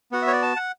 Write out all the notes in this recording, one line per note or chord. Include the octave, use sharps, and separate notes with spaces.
B3 F#4 F#5
E5
C#5
D5
A5
F#5